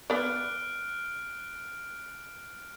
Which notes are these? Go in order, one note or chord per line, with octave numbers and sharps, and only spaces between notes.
B3 D5 F6 F#6 D7